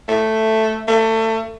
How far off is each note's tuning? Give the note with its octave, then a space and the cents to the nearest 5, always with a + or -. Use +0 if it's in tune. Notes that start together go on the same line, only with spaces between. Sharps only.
A3 +0
A3 +25